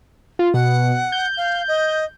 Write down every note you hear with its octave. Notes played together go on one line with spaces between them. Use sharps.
F4
B2 F#5
G6
F5
D#5